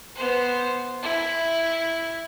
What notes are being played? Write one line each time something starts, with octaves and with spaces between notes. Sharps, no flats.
B3 C5
E4